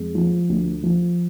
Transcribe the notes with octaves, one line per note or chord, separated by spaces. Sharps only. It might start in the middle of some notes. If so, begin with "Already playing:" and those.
Already playing: F2 G#3
F3
D2
F3